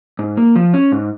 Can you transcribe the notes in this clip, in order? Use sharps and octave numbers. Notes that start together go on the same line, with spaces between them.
G#2
A#3
F3
C#4
G#2